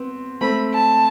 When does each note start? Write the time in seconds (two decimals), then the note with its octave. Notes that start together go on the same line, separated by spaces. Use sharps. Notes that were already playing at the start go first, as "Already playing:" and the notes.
Already playing: B3 C4
0.41 A3 C4 B5
0.74 A5